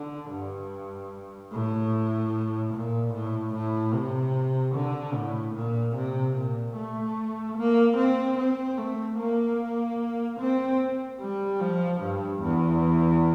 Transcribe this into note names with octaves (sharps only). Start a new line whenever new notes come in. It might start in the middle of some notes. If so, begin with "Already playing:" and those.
Already playing: D3
G2
A2
A#2
A2
A2
C3
D3
A2
A#2
C3
A#2
A3
A#3
C4
C4
A3
A#3
C4
G3
F3
G2
E2